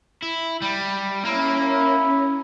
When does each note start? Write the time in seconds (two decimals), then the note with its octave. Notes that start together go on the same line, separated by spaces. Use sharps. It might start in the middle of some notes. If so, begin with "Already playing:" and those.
0.23 E4
0.62 G3
1.25 A#3 C#4 E4